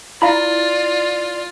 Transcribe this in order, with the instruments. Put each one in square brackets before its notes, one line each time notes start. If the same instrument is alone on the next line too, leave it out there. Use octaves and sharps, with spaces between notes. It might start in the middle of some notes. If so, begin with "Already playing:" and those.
[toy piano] E4 [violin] F4 [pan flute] D5 [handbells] F5 A#5 B5